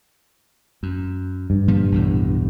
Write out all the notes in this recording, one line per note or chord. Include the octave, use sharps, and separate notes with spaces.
F#2
G2
A#2 F3 G3
B1 E2 A2